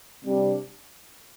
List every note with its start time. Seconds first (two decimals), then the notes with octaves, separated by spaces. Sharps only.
0.23 C3 G3 D4